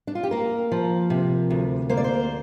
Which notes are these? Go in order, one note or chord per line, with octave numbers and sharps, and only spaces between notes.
D4
F4
G4
A#3 A#4
F3
C3
D2
A#3 C5
D5
C5